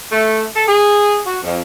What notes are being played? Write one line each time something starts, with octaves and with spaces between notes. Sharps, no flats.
A3
A4
G#4
F#4
F2